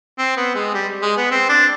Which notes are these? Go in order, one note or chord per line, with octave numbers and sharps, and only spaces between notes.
C4
B3
G#3
G3
G#3
B3
C4
D4